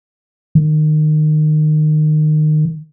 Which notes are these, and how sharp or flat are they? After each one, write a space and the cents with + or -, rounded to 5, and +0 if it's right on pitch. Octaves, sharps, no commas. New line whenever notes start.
D#3 -25